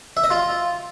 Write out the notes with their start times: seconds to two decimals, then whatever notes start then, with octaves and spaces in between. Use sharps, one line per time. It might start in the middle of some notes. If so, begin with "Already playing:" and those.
0.17 E5
0.24 D#5
0.31 F4